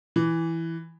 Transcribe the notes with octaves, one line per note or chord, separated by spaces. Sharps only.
E3